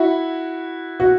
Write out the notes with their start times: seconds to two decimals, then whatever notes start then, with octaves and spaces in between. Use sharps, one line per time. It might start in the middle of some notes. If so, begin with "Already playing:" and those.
Already playing: E4 F#4
1.00 F#4